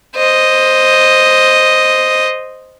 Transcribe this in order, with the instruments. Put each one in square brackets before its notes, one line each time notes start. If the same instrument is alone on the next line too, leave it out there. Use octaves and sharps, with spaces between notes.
[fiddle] C5 D#5